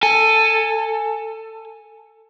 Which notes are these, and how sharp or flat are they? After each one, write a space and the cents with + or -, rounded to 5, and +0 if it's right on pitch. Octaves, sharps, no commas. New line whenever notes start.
A4 +15 G#5 +0